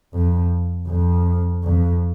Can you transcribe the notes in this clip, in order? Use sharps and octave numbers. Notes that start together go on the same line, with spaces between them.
F2
F2
F2